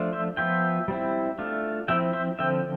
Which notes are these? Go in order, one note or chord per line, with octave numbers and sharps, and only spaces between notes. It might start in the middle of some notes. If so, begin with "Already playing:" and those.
Already playing: F3 A3 D4 F4
C5 E5
F3 B3 F4 E5 G5
G3 C4 E4
A3 D4 F4
F3 C4 E4 E5 G5
C5 E5
D3 F3 C4 E5 G5